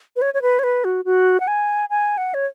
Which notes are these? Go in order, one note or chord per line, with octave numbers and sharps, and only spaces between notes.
B4
C#5
C#5
B4
C#5
B4
F#4
F#4
F#5
G#5
G#5
F#5
C#5